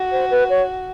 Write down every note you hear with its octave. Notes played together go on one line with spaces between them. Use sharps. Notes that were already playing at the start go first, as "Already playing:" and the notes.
Already playing: F#4
C5
B4
C#5